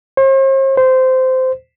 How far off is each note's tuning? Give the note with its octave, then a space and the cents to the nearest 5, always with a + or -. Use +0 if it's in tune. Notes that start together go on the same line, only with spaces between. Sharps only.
C5 +45
C5 -15